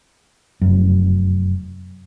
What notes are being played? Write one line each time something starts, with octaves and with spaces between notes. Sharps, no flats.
F1 F#2